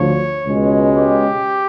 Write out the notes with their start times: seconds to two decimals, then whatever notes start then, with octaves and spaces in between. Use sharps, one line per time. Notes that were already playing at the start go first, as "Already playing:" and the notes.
Already playing: D2 D3 F3 C#5
0.46 C#2 B2 G#3 C#4
0.97 G4